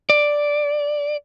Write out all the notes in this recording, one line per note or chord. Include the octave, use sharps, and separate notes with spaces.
D5